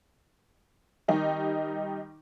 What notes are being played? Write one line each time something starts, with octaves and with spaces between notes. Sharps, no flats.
D#3 G3 D#4 G4